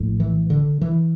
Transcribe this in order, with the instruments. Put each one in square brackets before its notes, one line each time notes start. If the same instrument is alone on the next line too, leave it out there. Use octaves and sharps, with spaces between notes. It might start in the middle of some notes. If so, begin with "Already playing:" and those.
Already playing: [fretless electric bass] A#1 A2
E3
D3
E3